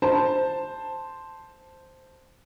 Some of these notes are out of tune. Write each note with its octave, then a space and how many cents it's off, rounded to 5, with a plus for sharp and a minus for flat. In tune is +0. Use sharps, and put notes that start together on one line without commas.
C5 +0 A5 +0